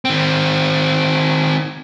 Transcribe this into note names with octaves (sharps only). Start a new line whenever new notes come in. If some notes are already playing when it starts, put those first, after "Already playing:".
D#3 C4